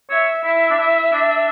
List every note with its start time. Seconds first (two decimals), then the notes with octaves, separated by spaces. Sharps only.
0.10 C#5 E5
0.44 E4 E5
0.70 D4
0.78 E4
1.13 D4